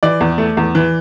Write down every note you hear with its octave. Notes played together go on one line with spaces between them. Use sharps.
E3 D5
E2
A3
E2
E3